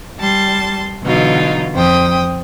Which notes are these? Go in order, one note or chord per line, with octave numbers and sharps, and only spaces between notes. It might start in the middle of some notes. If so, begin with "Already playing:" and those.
G3 A5 C6
B2 D3 E3 F#3 D#4 F4
F2 C5 G5 D#6